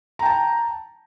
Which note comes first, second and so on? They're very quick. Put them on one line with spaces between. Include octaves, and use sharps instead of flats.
A#5 G5 A5